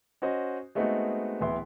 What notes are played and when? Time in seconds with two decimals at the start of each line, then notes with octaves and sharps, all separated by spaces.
0.22 C#4 F#4 C5 D#5
0.75 G#3 A3 B3 C4 D#4 F#4
1.41 D1 E3 B3 E4 C6